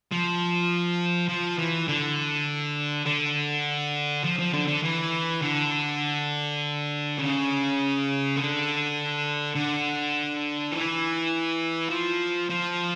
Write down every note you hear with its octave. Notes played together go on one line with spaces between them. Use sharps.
F3
F3
E3
D3
D3
F3
F3
D3
D3
E3
D3
C#3
D3
D3
E3
F3
F3